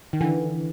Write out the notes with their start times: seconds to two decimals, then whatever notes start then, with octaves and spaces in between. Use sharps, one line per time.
0.13 D#3
0.21 D3 E3